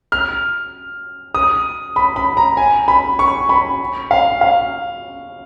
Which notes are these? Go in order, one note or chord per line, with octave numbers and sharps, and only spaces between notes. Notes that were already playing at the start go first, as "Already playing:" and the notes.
F6
D#6
B5
B5
A#5
G#5
B5
C#6
B5
F5
F5